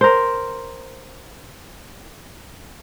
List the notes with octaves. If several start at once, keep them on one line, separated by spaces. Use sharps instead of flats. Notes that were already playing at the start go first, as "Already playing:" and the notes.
A#4 C5